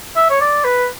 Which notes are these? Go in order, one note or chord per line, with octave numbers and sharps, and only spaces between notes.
E5
C#5
D5
B4